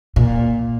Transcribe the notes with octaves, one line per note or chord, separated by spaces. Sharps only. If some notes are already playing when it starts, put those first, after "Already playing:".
A#2